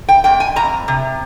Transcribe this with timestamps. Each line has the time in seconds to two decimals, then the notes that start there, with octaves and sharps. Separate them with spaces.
0.09 G5
0.24 F2 G5
0.40 G#5
0.56 F2 A#5
0.88 C3